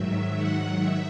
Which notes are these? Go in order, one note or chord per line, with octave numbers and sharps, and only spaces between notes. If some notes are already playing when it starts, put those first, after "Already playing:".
Already playing: G#2 D#3 F#3 E5
F#5
E5